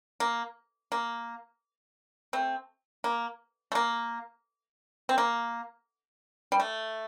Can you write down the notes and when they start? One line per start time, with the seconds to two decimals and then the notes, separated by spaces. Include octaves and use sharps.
0.20 A#3
0.92 A#3
2.33 A3 C4
3.04 A#3
3.72 A3
3.75 A#3
5.09 C4
5.18 A#3
6.52 G3
6.60 A3